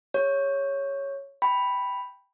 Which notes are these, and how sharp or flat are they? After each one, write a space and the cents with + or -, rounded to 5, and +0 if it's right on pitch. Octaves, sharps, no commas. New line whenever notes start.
G#4 -30 C#5 +0
G5 +5 B5 +0